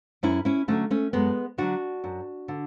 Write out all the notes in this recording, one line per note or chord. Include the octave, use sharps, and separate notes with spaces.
F#2 C#4 E4
C#4 E4
D3 F#3 A3 C#4
A3 C#4
F#2 G#3 B3
D3 F#3 D4 F#4
F#2
D3